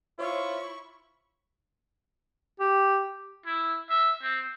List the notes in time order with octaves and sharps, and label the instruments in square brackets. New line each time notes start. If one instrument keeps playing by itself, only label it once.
[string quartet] E4 C#6 [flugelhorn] F4 [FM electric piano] C5 C#5 E5
[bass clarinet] G4
[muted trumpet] E4
E5
C4